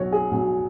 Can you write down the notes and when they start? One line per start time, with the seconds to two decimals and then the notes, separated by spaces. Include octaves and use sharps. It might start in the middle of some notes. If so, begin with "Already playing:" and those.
Already playing: B1 B2 F#3 F#4 C#5
0.12 G#4
0.31 B1 B2 F#3